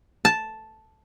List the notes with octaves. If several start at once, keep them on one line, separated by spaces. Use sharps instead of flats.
A5